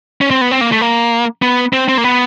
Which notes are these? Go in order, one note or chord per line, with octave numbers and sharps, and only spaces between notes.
C#4
C4
B3
C4
A#3
A3
A#3
B3
C4
C4
A#3
B3